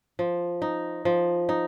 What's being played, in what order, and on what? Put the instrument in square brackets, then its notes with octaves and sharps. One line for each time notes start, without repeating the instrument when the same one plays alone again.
[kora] F3
D#4
F3
D#4